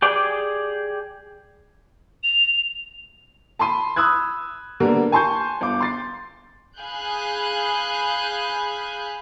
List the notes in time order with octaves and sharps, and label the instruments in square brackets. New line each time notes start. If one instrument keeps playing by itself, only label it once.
[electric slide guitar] G4 G#4 D5
[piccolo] F7
[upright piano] A5 B5 C6 D#7
B5 D#6 E6 F#6 G#6
D3 G3 A#3 B3 A#4
G#5 A5 C6 C#6 G6
G1 D6
C6 A6 C7
[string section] G#4 F5 G#5 B5 F#6 G6